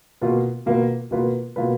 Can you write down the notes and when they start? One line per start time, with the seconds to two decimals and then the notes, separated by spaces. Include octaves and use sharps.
0.21 B2 A#3 F4 B4
0.66 B2 A#3 F4 B4
1.11 B2 A#3 F4 B4
1.56 B2 A#3 F4 B4